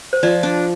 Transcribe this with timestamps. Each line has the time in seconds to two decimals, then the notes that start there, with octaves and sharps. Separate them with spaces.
0.13 C5
0.23 F3 D5
0.43 D4